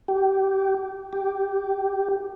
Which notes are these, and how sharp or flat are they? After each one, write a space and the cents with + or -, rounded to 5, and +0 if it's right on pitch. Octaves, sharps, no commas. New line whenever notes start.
G4 -20
G4 -5